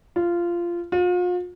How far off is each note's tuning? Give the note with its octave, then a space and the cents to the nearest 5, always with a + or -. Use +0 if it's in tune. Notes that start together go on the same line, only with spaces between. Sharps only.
F4 -15
F4 +40